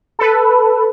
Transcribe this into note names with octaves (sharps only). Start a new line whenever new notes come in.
A4 B4